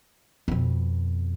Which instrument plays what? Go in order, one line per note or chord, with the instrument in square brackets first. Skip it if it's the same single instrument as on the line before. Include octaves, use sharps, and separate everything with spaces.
[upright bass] F2 B2